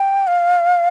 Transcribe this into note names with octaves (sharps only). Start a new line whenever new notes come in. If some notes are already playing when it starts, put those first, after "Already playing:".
Already playing: G5
F5